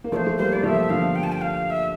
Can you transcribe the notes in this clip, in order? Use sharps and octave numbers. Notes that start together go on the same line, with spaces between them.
A#3
F3 A3 D5
C5
A3
G3 A#3 C5
G3 D5
F3 A3 F5
E5
D3 F3 F5
G5
A5
G5
F5
F5
E5